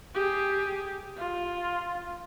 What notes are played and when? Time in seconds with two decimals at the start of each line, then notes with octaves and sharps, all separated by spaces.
0.14 G4 G#4
1.17 F4